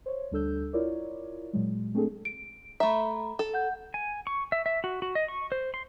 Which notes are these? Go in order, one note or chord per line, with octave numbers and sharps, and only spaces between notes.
C5 C#5
D2 G3 D4 A4 E6 G6
E4 F4 A#4 C#5 D5
A#2 F#3 G#3
A3 C4 D4 G#4 A4
D7
A3 E5 A#5 B5
A4
F#5 G6
G#5
C#6
E5
E5
F#4
F#4
D#5
C#6
C5
C6